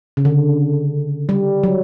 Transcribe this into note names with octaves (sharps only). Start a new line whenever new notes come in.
C#3
D3
G3
F#3